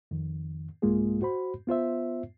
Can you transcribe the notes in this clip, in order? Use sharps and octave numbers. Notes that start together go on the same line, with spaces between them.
F2 D#3
C2 G#2 G#3 A#3 F4 G#4
F#4 C5 B5
B3 F4 C5 E5